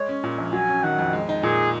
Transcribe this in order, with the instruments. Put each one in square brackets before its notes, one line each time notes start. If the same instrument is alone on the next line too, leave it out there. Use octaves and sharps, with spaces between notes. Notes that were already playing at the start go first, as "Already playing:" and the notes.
Already playing: [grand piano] G#3 [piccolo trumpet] C#5
[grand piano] C#4
A#2
A#1
[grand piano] F#3 [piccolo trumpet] G#5
[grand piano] C#4
[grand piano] D#3 [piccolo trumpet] F#5
[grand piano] F2
G#3
D#4
[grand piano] A#2 [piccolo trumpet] G#4